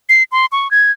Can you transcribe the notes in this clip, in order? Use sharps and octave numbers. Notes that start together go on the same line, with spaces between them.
C7
C6
C#6
G#6